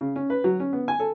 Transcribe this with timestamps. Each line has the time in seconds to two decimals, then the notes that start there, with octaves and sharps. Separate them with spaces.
0.01 C#3
0.16 C#4
0.30 B4
0.44 F#3
0.60 C#4
0.73 B3
0.88 G#5
1.00 A4